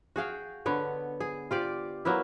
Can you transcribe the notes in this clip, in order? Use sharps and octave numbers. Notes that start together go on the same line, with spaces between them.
F#4 G#4 F5 G5
D3 B3 C#5
G#4
F4 G4 D5
F#3 A#3 B3 E4